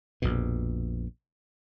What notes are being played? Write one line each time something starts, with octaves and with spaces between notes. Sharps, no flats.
A#1 F2 B2